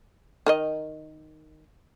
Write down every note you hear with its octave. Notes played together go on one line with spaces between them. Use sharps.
D#3 A#4 D#5